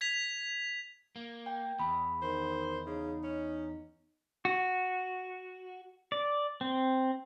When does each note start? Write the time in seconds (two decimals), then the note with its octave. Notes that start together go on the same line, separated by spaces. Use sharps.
0.01 G#6 B6 F7
1.16 A#3
1.46 G5
1.79 E2 B5
2.22 D#3 C5
2.86 C#3 D#4
3.23 C#4
4.45 F#4
6.12 D5
6.61 C4